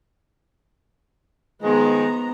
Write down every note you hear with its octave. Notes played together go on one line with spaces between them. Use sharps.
D#3 F3 G#3 B3 A#5